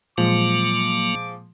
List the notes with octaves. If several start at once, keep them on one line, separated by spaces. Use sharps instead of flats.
A#2 F3 F#3 G#3 A#3 D6